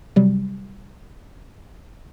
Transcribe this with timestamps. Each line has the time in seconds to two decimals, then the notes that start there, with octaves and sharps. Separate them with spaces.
0.16 C3 F#3 G3